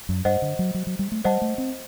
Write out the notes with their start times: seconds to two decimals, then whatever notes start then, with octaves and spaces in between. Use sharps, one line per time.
0.09 F#2
0.25 G2 C5 D#5 F#5
0.42 D3
0.59 F#3
0.74 F#3
0.87 F#3
0.99 G3
1.12 A3
1.25 G3 C5 D#5 F#5 A5
1.42 A3
1.58 C4